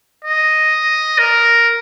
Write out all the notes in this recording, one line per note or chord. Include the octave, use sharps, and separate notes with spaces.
D#5
A#4